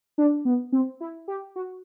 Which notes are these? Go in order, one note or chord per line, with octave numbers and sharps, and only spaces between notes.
D4
B3
C4
E4
G4
F#4